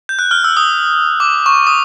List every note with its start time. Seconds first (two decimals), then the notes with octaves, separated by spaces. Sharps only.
0.09 G6
0.19 F#6
0.31 F6
0.44 E6
0.57 D#6
1.20 D6
1.46 C#6
1.67 D#6